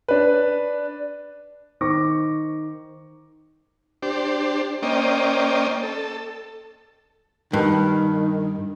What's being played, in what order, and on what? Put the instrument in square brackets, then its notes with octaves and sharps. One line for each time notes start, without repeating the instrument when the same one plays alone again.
[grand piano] D4 B4
D#3 C5 C#6 D6 A#6
[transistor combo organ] D4 G4 C5
A#3 C#4 C5 D5 D#5 G5
A4
[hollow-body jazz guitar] G2 [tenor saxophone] D#3